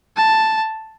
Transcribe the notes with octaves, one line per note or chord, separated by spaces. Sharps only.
A5